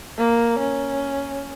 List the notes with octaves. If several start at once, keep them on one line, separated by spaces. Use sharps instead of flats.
A#3
C#4